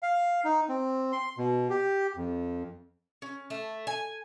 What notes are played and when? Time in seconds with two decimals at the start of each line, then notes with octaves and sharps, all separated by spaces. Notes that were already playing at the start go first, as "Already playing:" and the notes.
0.03 F5
0.45 D#4
0.69 C4
1.12 C6
1.38 B2
1.70 G4
2.16 F2
3.22 C#4
3.50 A3
3.87 G#5